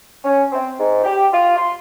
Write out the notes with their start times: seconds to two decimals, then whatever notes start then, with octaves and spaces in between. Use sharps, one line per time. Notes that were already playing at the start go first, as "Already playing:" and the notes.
0.24 C#4
0.52 C4
0.79 G#2
1.04 G4
1.33 F4
1.56 C6